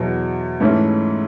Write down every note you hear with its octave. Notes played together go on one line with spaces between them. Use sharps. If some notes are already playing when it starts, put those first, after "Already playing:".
Already playing: E2 B2 F#3 B3
G#2 E3 A3 C#4 E4